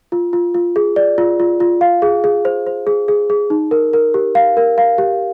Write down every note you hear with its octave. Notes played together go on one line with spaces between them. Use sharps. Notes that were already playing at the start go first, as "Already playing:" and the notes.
F4
F4
F4
G#4
D5
F4
F4
F4
F5
G#4
G#4
C5
C5
G#4
G#4
G#4
D#4
A#4
A#4
G4
F5
A#4
F5
G4